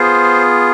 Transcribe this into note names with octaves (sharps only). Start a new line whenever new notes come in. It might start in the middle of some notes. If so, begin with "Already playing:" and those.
Already playing: B3 F4 G#4 C5